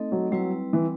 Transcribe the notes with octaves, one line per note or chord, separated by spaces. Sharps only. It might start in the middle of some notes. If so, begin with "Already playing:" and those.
Already playing: A3 C4 D#4 A4 D#5
F#3
F#3 G3 C4 E4 B4
E3